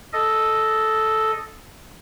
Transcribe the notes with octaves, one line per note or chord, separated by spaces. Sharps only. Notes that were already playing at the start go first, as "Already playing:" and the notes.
A4 D#5